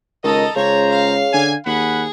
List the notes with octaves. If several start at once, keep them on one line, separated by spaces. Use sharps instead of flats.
C#2 D#3 A4 D#5 A#5
C#2 C#3 C5 C#5 A#5
F5
D3 G#5
D#2 G#4 F#5 B5